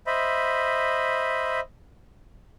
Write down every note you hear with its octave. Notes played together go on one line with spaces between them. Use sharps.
C5 D#5 E5 B5